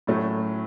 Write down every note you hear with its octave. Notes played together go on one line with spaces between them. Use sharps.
A2 F#3 A3 C#4